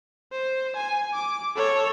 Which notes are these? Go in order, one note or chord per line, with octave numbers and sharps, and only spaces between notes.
C5
G#5
D6
A4 C#5